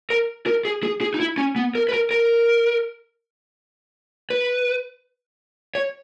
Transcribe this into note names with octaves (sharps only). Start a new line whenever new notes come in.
A#4
A#4
G#4
G#4
G#4
D#4
E4
C#4
B3
A#4
B4
A#4
A#4
B4
C#5